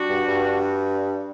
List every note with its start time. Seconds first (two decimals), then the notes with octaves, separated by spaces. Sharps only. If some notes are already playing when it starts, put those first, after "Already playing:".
Already playing: G3 D4 F#4
0.09 G2
0.28 G2